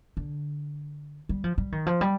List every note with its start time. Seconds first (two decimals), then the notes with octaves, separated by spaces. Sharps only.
0.17 D3
1.29 G3
1.44 F3
1.58 G3
1.72 D#3
1.86 F3
2.01 G3